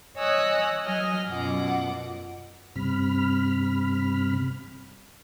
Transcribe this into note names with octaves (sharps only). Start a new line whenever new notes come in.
C#5 D#5 G#5 D#6 E6 F#6
F#3 D#5 G#5 F6
F#2 B2 F4 F#5 D6
G2 C3 B5 F6